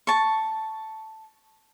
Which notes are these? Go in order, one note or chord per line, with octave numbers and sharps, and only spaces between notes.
A5 C#6